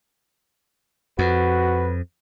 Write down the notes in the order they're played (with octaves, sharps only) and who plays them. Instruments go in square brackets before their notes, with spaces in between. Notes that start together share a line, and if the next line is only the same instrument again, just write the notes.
[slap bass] F2 [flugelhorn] F#4 [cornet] B4